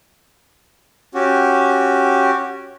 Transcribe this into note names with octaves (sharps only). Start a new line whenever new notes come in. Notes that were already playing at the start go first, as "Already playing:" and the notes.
C#4 F#4 G4